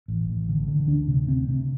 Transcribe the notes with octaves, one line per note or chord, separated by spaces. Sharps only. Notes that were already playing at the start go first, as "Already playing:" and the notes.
A1
A1
D3
D3
D2 D4
C3
C3 C4
C3